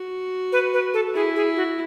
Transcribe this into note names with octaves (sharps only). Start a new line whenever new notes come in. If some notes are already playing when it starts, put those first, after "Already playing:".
Already playing: F#4
B4
B4
A4
E4 G#4
G#4
F#4